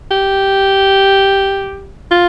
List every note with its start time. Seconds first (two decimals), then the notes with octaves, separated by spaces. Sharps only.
0.11 G4
2.11 F4